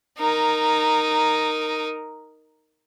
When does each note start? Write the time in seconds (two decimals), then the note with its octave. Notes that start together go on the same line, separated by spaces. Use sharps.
0.19 D#4 A#4